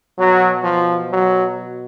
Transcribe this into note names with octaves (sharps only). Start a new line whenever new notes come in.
B2 F#3
F3
F#3